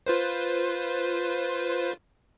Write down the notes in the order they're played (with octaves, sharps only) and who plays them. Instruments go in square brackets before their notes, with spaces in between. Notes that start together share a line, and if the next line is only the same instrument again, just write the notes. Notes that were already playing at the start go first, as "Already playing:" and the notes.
[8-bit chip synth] F4 B4 C5